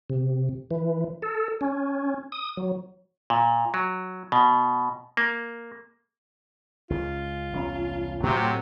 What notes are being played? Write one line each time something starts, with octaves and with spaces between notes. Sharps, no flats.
C3
E3
A4
C#4
D#6
F#3
A#2
F#3
B2
A#3
C#2 C#3 G#3 F4
E1 C2 C#4
A2 C3 F#3 A3